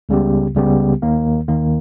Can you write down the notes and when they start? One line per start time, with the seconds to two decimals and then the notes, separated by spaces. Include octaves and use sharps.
0.09 C#2 C#3 G3 B3 G4
0.56 C#2 C#3 G3 B3 G4
1.02 D#2 D#3 A#3
1.48 D#2 D#3 A#3